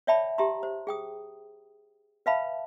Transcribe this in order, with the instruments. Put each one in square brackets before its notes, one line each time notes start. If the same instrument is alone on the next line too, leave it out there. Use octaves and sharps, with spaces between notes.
[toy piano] C#5 D5 E5 G5 A5 B5
G4 E5 A5 A#5 C6
C5
G#4 G5 D#6
B4 E5 F5 A5 B5